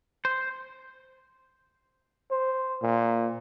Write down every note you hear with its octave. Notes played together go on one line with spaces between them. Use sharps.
C5
C5
A#2